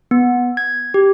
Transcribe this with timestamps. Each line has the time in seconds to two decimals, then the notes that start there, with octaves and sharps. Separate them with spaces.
0.11 B3
0.57 G#6
0.94 G4